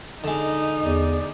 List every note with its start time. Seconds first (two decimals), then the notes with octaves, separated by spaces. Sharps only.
0.24 D3 G#3 D#4
0.85 E2 D5